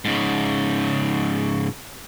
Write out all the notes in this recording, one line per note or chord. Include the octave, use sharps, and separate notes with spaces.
G#2 C#3